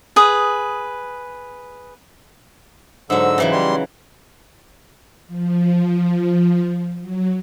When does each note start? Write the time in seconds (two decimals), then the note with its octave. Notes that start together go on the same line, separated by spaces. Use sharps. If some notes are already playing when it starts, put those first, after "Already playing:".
0.16 G#4 B4 D#6
3.10 G#2 D3 F#3 E6
3.38 C#3 E3 F#3
3.52 G3 C6
5.28 F3
7.01 F#3